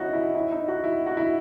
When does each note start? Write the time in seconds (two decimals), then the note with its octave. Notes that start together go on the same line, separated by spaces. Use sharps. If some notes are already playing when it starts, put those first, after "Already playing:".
Already playing: D#3 C#4 D#4 E4 F#4
0.13 E4
0.35 E4
0.51 D#4
0.68 F#4
0.84 E4
1.06 F#4
1.17 E4